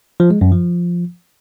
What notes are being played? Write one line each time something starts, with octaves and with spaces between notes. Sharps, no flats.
F3
G#3
F#2
F3